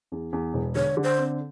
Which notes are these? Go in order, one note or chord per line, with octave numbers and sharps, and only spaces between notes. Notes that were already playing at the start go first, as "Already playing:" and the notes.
E2
E2
E1
D3 C#5
D3
C5
C4